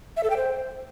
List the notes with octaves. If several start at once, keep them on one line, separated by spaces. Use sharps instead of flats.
E5
A4
G5
C5